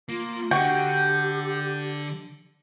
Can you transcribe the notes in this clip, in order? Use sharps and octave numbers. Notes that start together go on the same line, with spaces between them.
A#3 F4
D3 F#4 G4 G5